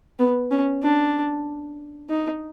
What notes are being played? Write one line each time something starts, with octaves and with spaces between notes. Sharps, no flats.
B3
C#4
D4
D#4